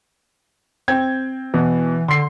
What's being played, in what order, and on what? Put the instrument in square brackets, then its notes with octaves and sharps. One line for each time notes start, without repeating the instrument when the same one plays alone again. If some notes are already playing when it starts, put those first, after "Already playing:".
[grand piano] C4 G5 G#6
[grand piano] B2 [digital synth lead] E3
[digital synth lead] D3 [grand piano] C6 C7